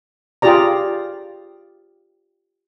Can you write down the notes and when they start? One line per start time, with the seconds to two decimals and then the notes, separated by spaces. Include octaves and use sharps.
0.42 F4 G4 G#4 D5 A#5